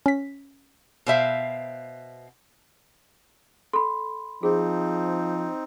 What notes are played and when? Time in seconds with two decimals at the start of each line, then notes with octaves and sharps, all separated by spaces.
0.06 C#4 B6
1.06 B2 C5 E5 F5
3.73 A4 B5 C6
4.43 F3 C4 D#4 G#4